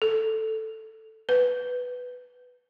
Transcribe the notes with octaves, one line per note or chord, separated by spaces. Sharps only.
A4
B4